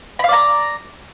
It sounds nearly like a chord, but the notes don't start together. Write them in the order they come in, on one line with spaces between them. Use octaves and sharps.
B5 F5 D5 A#5